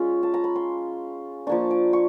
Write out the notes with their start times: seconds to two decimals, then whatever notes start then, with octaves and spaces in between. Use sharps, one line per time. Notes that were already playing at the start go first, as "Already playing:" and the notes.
Already playing: G#3 C#4 F4
0.23 A5
0.34 A#5
0.44 B5
0.55 C6
1.47 F3 A#3 D4 C#6
1.71 D6
1.93 C#6